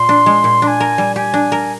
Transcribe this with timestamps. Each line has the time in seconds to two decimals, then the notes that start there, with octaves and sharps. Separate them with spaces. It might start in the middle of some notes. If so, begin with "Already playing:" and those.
Already playing: A#2 C6
0.09 D4
0.26 G#3
0.44 A#2
0.62 D4 C6
0.67 G#5
0.80 A#4
0.98 G3
1.16 G4 G#5
1.34 D4
1.52 A#4